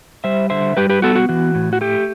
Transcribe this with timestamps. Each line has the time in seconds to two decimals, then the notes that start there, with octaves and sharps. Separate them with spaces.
0.24 G3 C5 E5
0.50 D3 C5 E5
0.77 G3 G4 B4
0.89 G4 B4
1.02 B3 F#4 A4
1.16 F#4
1.29 E3 F#4
1.55 A2
1.73 F#4
1.81 A3 G4